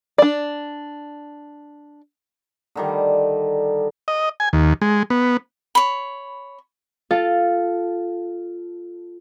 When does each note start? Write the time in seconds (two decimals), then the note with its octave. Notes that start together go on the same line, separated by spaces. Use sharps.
0.18 D4 D5
2.75 D3 D#3 G3
4.08 D#5
4.40 G#5
4.53 D#2
4.82 G#3
5.10 B3
5.75 C#5 B5
7.11 F4 A4 F5